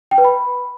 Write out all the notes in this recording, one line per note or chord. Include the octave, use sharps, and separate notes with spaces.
G5
B4
B5